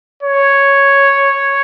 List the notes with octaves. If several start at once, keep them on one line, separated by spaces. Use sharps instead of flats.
C#5